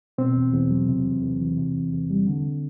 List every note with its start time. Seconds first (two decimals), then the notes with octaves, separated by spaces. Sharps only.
0.18 B2 C4
0.36 E2
0.53 E2
0.70 F#3
0.89 C3
1.06 E2
1.23 E2
1.41 E3
1.58 C3
1.75 E2
1.93 E2
2.10 G3
2.27 D3